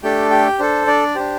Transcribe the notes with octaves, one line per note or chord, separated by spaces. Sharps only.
A3 D4 G4 A4 G5
G4 G5
D4 A4 C5
D4 D5
D4 G4 C5